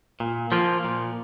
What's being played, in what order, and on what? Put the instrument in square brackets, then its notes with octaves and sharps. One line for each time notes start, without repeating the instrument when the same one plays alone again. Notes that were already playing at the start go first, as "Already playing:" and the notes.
[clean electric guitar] A#2
F3 A#3 F4
A#2